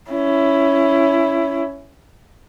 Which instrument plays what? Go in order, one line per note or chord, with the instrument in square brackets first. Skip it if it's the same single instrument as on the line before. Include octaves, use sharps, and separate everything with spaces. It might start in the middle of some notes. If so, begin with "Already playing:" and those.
[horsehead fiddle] C#4 E4